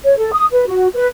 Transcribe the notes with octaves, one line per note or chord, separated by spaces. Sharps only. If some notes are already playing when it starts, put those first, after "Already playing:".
C#5
A4
D#6
B4
F#4
B4